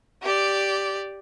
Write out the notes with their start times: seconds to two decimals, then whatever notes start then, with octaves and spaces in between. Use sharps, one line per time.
0.22 G4 D5